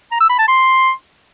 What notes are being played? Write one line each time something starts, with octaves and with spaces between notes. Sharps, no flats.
A#5
E6
B5
A5
C6